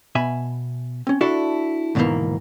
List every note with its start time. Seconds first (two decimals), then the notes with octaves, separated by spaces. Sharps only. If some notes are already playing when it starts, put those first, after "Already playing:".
0.15 B2 E5 G#5 B5
1.07 C4 C#4
1.21 D4 E4 F#4 A4 D5 A5
1.95 D2 G#2 B2 D#3 E3 A#3